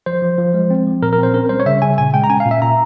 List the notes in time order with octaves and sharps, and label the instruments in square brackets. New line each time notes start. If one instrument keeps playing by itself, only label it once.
[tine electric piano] F3 C5
F3
F3
G#3
C4
F3
A#2 A#4
A#4
C4 C5
C#4 A#4
G3 C5
C#5
C#3 E5
C#3 G#5
A#2 G#5
G#3 G5
A#5
C#4 G#5
F5
A#2
E5
A#2 A#5